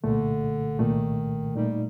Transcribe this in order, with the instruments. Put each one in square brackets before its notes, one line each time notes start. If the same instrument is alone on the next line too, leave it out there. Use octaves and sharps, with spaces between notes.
[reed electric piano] C2 A#2 A3 [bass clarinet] D3
[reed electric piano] C2 A#2 A3 [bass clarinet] D#3
[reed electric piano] A#2 A3 D#4 [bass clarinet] G3